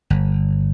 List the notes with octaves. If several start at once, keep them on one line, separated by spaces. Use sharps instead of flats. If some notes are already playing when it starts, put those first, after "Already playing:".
G1